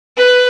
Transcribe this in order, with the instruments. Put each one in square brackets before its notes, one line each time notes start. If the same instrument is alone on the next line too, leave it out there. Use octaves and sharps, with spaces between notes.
[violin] B4